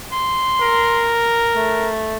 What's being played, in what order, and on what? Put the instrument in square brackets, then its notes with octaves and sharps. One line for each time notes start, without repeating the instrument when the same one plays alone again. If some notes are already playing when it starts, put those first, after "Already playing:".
[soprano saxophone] C6
[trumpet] A#4
[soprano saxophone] A3